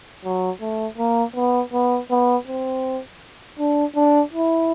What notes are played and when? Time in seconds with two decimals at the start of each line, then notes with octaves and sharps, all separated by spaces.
0.25 F#3
0.61 A3
0.98 A#3
1.36 B3
1.73 B3
2.11 B3
2.47 C4
3.59 D4
3.96 D4
4.33 E4